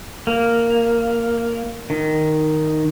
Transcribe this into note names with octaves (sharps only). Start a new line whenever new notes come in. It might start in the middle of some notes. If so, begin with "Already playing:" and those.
A#3
D#3